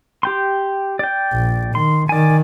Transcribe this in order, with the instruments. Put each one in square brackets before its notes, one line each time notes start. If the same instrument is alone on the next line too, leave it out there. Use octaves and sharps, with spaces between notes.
[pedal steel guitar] G4 G5 C6
D5 G5
[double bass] A#1
[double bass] D#3 [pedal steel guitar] C6
[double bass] D#3 [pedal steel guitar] D5 G#5